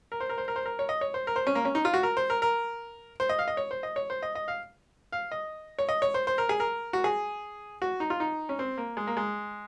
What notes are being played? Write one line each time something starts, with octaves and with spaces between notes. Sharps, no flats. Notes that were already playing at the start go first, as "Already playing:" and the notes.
A#4
C5
A#4
C5
A#4
C5
A#4
C#5
D#5
C#5
C5
A#4
C5
C#4
A#3
C#4
D#4
F4
F#4
A#4
C5
A#4
A#4
C5
D#5
F5
D#5
C#5
C5
D#5
C#5
C5
D#5
D#5
F5
F5
D#5
C#5
D#5
C#5
C5
C5
A#4
G#4
A#4
F#4
G#4
F#4
D#4
F4
D#4
C#4
C4
A#3
G#3
A#3
G#3